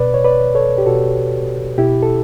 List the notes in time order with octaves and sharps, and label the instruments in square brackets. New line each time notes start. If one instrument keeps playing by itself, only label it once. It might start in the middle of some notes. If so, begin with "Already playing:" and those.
Already playing: [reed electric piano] B2 B4 D5
C#5
B4 D5
A4 C#5
G4
B2 F#4 A4
B2 E4 G4
A4